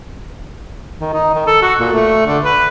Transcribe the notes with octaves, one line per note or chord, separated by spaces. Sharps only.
D#3
D#4
D#3
A4
F#4
A#2
A3
D3
B4